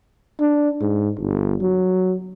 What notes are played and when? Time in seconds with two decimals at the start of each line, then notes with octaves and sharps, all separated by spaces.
0.40 D4
0.81 G#2
1.19 G1
1.61 F#3